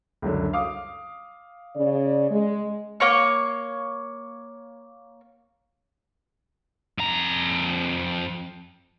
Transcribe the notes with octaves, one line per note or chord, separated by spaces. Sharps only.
C#2 F#2 D3
F5 D6 D#6
C#3 D5
G#3
A#3 C#5 C#6
F2 A#5